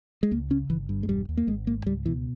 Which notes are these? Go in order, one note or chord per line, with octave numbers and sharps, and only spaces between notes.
G#3
C#2 A#3
C#3 C#4
G1 E3
G2
G#3
E1 G3
D#2
A#3
G#1 G#3
G#2 A#3
C#2 G3
B2 E3